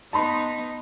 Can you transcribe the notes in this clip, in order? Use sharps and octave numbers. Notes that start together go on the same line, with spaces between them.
B3 D#4 A5 B5 C6